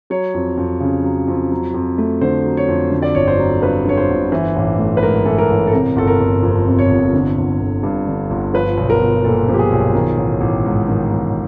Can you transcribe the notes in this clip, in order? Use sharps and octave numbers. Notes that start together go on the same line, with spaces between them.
F#3 C#5
F2
F2
C#3
F#3
F2
F#3
F2
A3
D3 C5
F#3
C#5
F2
D3
D5
G1 C#5
C5
F#3
G2 B4
D3 C#5
C5
G1
E3
A1
A3
B4
G#2 A#4
E3 A4
A#4
A1
A4
C3 A#4
G1 A4
A#4
G1
F2
C3
C#5
G1
D3
G1
G1
G2
D3
G1
F3 B4
B1
A#4
B1
A#2 A4
F3
G4
G#4
B1
D#3
A1
A1
G#2
D#3
A1